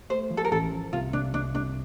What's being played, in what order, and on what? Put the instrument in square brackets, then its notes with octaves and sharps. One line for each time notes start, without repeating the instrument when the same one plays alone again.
[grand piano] A3 [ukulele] C5
[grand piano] F3
[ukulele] A4
A#4
[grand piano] A1 [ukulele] A4
[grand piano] F3
[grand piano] C2 [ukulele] F4
[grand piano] C2 [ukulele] D4
[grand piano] C2 [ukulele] D4
[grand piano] C2 [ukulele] D4